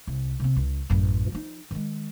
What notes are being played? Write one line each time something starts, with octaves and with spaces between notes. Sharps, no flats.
C2
C3 C4
C#2
A1 F#2
F3 D#4
D#3 G#3